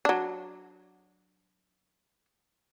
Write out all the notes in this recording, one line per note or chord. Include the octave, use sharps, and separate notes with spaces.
F#3 D4